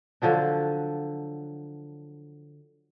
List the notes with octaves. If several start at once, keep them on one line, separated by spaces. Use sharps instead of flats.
D3 F3 F#3 D4